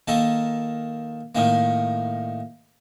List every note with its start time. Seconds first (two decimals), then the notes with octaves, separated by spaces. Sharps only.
0.08 D#3 A#3 A4
1.35 A2 D#3 A#3